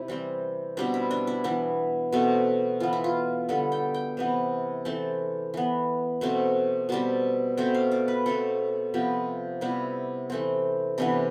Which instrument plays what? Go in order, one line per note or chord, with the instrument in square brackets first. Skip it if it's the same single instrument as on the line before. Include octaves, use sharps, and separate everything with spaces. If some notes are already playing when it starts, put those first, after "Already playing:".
Already playing: [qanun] C3 E4
E3 G3 C4
B2 G3 C4 D4
E4
D4
E4
E3 B3 E4
B2 A3 C4
E3 B3 F4
E4
F4
D3 G3 B3 A4
G5
G5
C3 E3 B3
E3 A3 C4 A5
E3 B3
B2 A3 C4
B2 G3 C4 A5
B2 A3 C4 G5
F5
D5
B4
B2 A3 C4 A4
C3 F3 B3 G4
C3 G3 B3 E4
E3 A3 C4
C3 E3 B3 D4